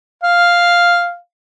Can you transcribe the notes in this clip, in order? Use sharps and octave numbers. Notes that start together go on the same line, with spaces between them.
F5